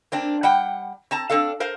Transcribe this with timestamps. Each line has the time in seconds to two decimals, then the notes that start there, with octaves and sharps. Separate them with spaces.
0.12 A#3 C4 D4
0.43 G3 F#5 G5
1.11 C4 A5 A#5
1.30 C4 D4 A4 F5
1.60 A#4 C5 F5